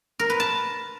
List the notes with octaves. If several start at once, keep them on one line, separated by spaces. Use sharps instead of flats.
A#4
B4
A5